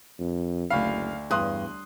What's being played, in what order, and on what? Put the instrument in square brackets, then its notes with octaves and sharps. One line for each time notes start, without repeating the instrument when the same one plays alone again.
[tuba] F2
[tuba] F#1 [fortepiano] D2 B5 [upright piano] F5
[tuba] E2 [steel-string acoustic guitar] G2 [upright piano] C6 D#6 F#6